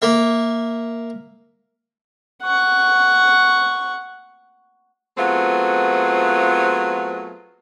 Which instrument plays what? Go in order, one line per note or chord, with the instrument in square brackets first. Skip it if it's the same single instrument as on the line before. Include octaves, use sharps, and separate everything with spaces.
[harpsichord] A#3 E5
[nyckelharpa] F#5 C#6
[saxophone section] F#3 A3 B3 C4 F4 G#4